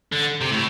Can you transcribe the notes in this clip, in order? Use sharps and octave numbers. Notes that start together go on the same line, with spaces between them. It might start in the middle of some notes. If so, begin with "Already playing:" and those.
D3
C3
A2